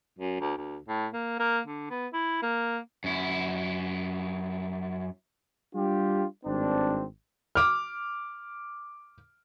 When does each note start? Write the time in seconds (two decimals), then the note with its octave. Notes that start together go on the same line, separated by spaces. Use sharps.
0.19 F#2
0.40 D2
0.57 D2
0.88 A2
1.13 A#3
1.39 A#3
1.67 D3
1.90 B3
2.13 E4
2.42 A#3
3.04 F#2 E4
5.74 G3 D4 F4 G4
6.46 G#1 G2 C4 D4
7.55 D6 F6